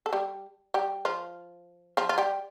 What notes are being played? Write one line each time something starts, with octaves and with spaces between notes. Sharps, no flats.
A4
G3 G4
G3 G4
F3 F4
F3 F4
F4
G3 G4